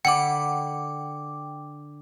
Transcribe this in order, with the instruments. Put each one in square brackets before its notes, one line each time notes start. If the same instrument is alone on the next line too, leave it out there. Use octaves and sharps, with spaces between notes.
[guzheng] D3 B5 [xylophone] F#5 [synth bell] G5 D6